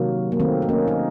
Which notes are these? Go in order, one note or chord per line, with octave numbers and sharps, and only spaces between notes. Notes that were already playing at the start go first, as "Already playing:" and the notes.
Already playing: C3 D#3 F#3 A#3
A#3
D#3 A3 C4
D#4
A#3 C#4
D#4